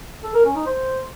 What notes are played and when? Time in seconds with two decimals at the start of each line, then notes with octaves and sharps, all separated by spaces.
0.24 A4
0.34 A#4
0.45 C#4
0.56 D#4
0.66 C5